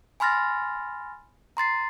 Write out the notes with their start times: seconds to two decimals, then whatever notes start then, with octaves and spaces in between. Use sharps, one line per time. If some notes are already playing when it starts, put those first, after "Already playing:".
0.20 G#5 B5 C6 F6 A6 A#6
1.57 A#5 C6 A6 C7